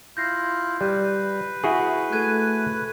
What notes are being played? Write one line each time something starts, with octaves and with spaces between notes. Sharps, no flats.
E4 F4 G6 A#6 C7
G3 B4
E4 F#4 G#4 C#6
A3 F#6 G#6 D#7